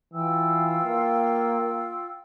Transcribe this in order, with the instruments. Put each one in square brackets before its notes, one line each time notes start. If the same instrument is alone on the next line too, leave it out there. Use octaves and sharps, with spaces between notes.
[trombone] E3 [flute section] F4 G5 E6
[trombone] A#3